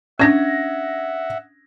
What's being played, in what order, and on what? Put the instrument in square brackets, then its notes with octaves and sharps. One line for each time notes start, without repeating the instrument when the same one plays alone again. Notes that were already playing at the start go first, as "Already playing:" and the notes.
[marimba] C#4 D4 [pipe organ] E5 F#5 [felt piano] G#6 A#6